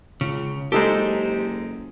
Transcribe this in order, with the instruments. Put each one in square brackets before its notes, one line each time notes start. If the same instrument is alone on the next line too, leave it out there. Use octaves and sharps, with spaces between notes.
[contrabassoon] C#2 [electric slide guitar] C#3
[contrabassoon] F#1 [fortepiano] G#3 D#4 A4 [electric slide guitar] G4 C5